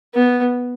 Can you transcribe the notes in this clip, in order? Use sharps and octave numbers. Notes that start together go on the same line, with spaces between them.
B3